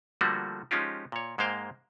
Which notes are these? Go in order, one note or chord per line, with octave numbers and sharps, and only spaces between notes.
D3 F3 G3 A3 A#3 F#4
F3 G#3 C#4 D#4 F4 G4
A#2 C#5
G#2 G#3 A#3 C5 F5 G5